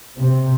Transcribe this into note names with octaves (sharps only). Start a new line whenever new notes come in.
C3